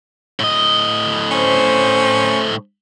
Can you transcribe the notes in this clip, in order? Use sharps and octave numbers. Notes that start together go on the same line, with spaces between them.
A2 D#5
C#4 C5